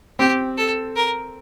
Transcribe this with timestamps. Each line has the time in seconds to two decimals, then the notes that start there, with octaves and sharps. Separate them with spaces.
0.19 C4 G4
0.57 A4
0.96 A#4